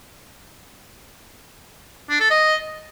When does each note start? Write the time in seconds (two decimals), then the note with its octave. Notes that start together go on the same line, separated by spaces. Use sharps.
2.10 D4
2.20 A4
2.30 D#5